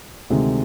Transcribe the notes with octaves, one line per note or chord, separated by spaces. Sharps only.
D2 C3 D#3 G#3